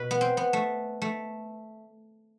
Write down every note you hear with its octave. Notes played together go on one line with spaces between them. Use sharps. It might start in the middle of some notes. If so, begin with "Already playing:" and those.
Already playing: B2 B4
B3
C4
B3
A3
A3